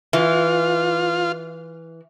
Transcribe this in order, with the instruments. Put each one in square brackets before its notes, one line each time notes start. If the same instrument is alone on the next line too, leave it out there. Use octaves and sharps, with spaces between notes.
[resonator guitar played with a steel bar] E3 [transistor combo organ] F4